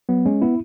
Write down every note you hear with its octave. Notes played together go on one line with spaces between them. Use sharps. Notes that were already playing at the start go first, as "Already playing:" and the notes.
F#3 B3
G#3 C#4
B3 E4